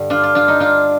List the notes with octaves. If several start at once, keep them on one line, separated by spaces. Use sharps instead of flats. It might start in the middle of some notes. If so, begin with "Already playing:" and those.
Already playing: G2 D3
D4 F4
F4
D4 F4
D#4
D4 F4